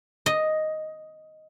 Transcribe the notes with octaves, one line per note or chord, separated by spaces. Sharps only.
D#5